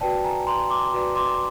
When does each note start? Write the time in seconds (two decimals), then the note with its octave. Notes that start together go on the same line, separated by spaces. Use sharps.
0.01 F#4 B4 D5 G5 A5
0.24 G#5 A#5
0.47 A#5 C6
0.70 C6 D6
0.93 F#4 B4 D5
1.16 C6 D6